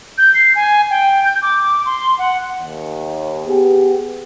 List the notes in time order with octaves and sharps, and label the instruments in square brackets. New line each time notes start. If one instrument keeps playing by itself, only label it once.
[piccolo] G6
C7
G#5
G5
G6
D6
C6
F#5
[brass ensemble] D#2
B3 G4 G#4